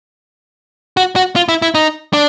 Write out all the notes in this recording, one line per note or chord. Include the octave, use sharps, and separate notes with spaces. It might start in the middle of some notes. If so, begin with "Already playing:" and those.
F#4
F#4
F4
E4
E4
D#4
D4